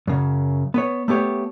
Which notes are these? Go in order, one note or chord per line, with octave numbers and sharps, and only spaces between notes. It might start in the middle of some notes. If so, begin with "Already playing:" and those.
F#2 C#3
B3 B4 C#5
A3 B3 G4 C#5